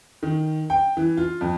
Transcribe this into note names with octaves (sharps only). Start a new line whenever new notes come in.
D#3
G5
E3
F4
F2